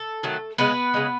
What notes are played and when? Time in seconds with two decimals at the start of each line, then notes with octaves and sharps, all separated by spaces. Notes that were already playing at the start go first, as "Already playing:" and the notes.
Already playing: A4
0.23 D#3 F#3 A3
0.58 C#3 G#3 B3 B4
0.94 C#3 G#3